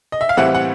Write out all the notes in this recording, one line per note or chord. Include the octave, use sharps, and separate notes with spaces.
D#5
E5
F5
A2 E3 G3 C4 E4 F#5
F#5